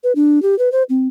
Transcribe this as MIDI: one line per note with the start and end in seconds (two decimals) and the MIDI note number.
0.04 0.13 71
0.16 0.42 62
0.42 0.58 67
0.59 0.72 71
0.72 0.83 72
0.89 1.08 60